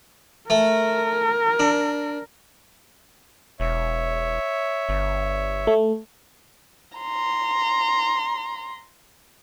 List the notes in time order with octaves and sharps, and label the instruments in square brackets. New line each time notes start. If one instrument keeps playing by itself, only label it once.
[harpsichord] A3 [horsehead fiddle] A#4
[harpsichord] D4
[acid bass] E1 [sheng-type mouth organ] C#5 E5
[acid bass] G1
[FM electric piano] A3
[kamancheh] A#5 C6